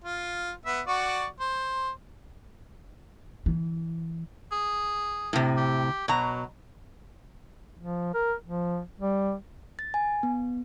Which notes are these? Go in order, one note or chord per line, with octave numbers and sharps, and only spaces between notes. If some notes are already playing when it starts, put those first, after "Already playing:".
F4
B3 E5
F#4 D5 C#6
C5
E3
G#4
A2 C3
G4
B2 F#3 A#5
F3
A#4
F3
G3
A6
G#5
B3